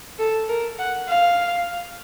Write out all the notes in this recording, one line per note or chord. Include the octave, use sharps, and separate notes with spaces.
A4
A#4
F#5
F5